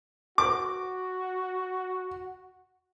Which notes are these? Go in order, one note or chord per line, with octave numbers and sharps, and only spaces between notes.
F#4 D6